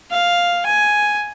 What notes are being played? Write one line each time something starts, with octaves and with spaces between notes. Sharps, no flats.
F5
G#5